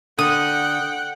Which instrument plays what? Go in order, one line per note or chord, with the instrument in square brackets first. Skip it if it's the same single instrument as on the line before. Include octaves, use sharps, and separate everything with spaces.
[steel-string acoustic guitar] D3 [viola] F#5 G5 [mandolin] D#6